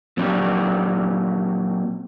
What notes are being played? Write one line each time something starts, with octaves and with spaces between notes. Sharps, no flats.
A#2 F#3 C4 D4 F#4 G4